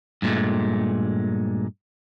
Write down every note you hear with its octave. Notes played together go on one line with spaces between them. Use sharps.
G2 A#2 G#3 A3